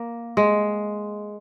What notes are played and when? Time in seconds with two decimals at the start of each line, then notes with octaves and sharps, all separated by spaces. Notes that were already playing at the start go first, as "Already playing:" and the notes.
Already playing: A#3
0.37 G#3